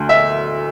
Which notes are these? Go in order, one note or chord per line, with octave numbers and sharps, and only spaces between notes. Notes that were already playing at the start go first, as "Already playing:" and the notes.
Already playing: D2 D3 A3
E5